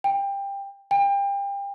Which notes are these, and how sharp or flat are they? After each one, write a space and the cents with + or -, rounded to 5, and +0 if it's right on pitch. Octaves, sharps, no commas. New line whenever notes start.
G5 +20
G5 +30